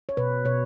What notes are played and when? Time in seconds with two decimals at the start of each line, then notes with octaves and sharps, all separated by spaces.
0.09 C#5
0.17 B2 B4
0.45 B2 C#5